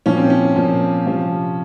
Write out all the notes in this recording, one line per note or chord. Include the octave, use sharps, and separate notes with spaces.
A#2 F3 C#4
C4
C#4
A#2 F3
C3 F3